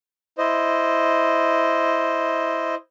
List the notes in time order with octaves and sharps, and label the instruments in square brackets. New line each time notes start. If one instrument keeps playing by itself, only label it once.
[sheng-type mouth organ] E4 C5 D#5